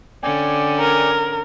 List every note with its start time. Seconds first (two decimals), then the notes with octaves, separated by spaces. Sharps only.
0.23 D3 C#4 D5 G5 G#5
0.80 A#4